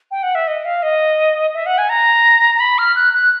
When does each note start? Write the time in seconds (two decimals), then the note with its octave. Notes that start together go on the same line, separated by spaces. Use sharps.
0.11 G5
0.23 F#5
0.35 E5
0.47 D#5
0.65 F5
0.83 D#5
1.54 E5
1.66 F#5
1.78 G#5
1.89 A#5
2.55 A#5
2.60 B5
2.78 F6
2.96 F#6
3.13 F#6